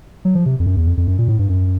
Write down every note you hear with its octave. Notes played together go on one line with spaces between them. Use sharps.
F#3
F3
C3
F2
F#2
E2
F2
F2
F#2
A#2
A2
G2
F#2